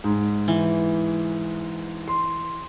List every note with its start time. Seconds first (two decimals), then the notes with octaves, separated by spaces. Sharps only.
0.04 G#2
0.48 E3
2.08 C6